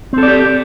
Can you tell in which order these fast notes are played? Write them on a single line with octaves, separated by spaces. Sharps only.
C4 A4 D5 G4